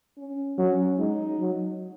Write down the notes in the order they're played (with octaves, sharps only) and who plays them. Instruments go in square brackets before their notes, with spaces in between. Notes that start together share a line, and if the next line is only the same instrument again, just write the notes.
[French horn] C#4
[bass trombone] F#3 [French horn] C#4
[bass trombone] G#3 [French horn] D#4
[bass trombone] F#3